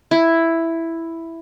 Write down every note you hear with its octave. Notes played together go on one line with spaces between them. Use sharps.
E4